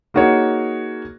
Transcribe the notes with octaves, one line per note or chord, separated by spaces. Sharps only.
A#3 D#4 F#4 G#4 C#5